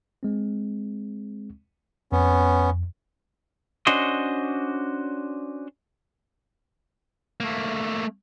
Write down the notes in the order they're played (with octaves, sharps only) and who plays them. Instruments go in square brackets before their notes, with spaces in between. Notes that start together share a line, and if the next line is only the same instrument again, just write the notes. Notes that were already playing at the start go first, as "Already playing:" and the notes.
[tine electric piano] G#3 C4
[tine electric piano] F2 [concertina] B3 C#4
[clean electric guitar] C#4 D4 F#4 C5 D#5
[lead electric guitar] A3 A#3